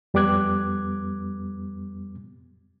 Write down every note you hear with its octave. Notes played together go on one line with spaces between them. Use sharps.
F2 G3 B3 D6 F#6 G#6